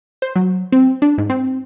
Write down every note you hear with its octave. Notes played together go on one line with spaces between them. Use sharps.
C5
F#3
C4
D4
G#2
C4